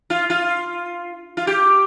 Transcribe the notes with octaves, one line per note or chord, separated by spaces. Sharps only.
F4
F4
F4
G4